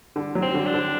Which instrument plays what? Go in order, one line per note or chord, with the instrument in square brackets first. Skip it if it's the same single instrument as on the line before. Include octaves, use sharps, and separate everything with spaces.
[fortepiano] D3
F#3
[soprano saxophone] C4
[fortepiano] D3
[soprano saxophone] D4
[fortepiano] D3